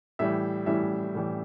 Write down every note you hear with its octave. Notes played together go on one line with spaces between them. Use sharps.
A2 E3 G3 E5
A2 E3 G3 E5
A2 E3 G3